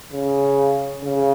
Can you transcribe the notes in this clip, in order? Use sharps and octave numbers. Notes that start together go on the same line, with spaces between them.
C#3
C#3